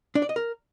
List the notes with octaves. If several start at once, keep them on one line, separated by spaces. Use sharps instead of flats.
D4
D5
D#5
A#4